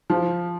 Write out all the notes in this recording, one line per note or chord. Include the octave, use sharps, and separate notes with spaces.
F3